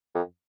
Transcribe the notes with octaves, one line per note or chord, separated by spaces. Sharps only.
F2